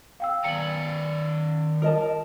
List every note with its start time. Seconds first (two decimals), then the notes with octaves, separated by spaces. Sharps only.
0.20 F5 G5 E6
0.44 D#3 D5 A#5 C#7 F#7
1.82 A#4 D#5 A5